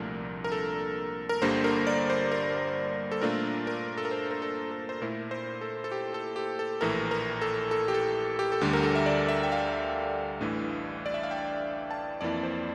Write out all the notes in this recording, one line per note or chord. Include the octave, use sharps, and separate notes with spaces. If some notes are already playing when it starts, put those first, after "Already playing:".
Already playing: C2 A#2 F3 A3 D4 A#4
A#4
A4
A#4
G1 G2 D3 G3 A#3 C5
A#4
D5
C5
A#4
A4
A#2 A3 D4 F4 A#4
A#4
A4
A#4
C5
A#4
A4
A4
C5
A#2 A3 E4 A#4
C5
A4
A4
G4
A4
G4
A4
A#1 A2 E3 A#4
A#4
A4
A4
G4
A4
G4
A4
D2 D3 G3 G4
A#4
A4
E5
D5
E5
G5
F5
A1 A2 E3 A3 D4
D5
E5
F5
G5
A5
F2 E3 A#3 E4 D5
C5